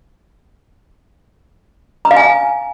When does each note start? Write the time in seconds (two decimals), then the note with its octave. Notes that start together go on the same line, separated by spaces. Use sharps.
2.05 A#5
2.11 F5
2.17 G#5